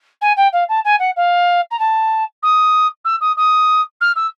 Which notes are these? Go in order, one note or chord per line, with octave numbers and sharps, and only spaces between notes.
G#5
G5
F5
A5
G#5
F#5
F5
A#5
A5
D#6
E6
D#6
D#6
F6
E6